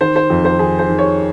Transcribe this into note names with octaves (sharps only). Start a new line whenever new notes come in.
D#3 C5
C5
F2
C5
D#3 G#4
C5
D#3
C#5